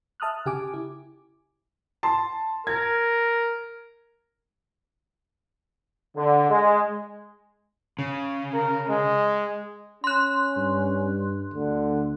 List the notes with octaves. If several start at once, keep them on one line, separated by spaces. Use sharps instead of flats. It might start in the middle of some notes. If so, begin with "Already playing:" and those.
E5 A5 D#6 F6 F#6
C#3 G4 G#5 D6
E4
A5 C6
A#4 G#6
D3
G#3
C#3
A#4
G#3
C#4 C6 F#6
G2
D2 D3